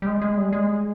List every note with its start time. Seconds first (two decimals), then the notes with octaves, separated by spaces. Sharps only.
0.02 G3
0.06 G#3
0.21 G#3
0.37 G3
0.53 G#3